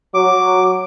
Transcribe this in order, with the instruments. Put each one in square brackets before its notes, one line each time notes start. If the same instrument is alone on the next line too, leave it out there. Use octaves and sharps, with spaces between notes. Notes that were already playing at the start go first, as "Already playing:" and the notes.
[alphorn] F#3 [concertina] D6